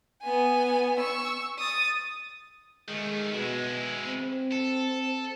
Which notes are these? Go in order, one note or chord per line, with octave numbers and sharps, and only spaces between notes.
B3 G#5
C#6 E6
D#6 A6
D#3 G#3 A3
B2 G#3 E4
C4
A4